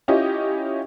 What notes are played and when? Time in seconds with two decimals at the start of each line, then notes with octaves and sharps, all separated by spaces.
0.08 C#4 E4 F4 G4 D#5